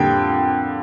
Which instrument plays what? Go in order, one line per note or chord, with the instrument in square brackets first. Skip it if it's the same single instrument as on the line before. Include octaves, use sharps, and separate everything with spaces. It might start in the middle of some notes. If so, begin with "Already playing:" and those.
Already playing: [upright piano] F2 D3 G3 A#3 G5